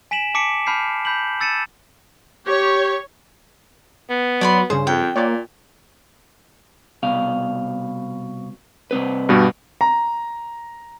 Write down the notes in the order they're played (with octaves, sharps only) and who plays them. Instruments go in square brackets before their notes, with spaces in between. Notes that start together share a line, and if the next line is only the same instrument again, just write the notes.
[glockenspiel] G#5 B6 D7 E7 F#7
A5 D6 B6 C#7 D7
A5 B5 F6 G6 C7
B5 G6 B6 F#7
E6 A6 C#7 D#7 E7
[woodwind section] G4 [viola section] C#5
[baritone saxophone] B3
[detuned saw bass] F#3 [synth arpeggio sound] C#5 [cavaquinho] D5 B5 C6
[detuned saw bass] G2 [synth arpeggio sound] C#3 C#4 G#4 [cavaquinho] C5
[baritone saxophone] F2 [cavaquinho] G5
[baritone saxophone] A#2 [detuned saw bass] A#3 [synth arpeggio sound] C#5 D5
[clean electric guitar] C2 B2 F5
C2 C4 B4
[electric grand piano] G2 B2 G3
[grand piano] A#5